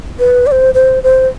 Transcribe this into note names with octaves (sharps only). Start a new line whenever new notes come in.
B4
D5
C5
C5
C5